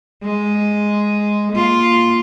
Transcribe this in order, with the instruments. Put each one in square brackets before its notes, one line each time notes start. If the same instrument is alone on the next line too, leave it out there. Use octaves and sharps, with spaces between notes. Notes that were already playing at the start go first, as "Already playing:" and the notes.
[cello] G#3
A#3 F4